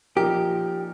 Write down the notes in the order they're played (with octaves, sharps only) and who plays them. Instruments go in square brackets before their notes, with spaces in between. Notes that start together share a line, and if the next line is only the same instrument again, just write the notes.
[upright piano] A#2 F3 D#4 A#4 [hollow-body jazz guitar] G4